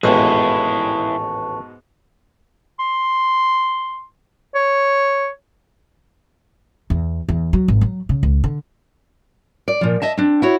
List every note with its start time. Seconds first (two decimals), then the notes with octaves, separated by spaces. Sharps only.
0.03 A1 D#2 G#2 B2 E4 G#4 A5 C#6
2.79 C6
4.55 C#5
6.90 E2
7.29 E2
7.53 F#3
7.68 G#1
7.81 F#3
8.09 C#3
8.23 C#2
8.44 D3
9.68 D5
9.81 A#2 F3
10.02 D#5 E5 A5
10.17 C4 D4
10.42 E4 F#4 C#5